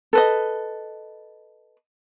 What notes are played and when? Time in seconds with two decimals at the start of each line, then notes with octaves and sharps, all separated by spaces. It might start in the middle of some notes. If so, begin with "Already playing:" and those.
0.13 A4 B4 D#5